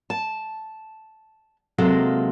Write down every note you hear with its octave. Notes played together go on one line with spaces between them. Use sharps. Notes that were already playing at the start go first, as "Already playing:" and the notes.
A5
C3 F#3 G#3 A#3 F4 A4